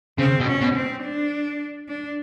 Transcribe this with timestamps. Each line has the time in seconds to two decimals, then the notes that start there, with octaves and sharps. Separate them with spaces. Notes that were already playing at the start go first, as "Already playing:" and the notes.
0.18 C#3 C4
0.40 B2
0.47 C#4
0.61 B2
0.76 C4
1.03 D4
1.88 D4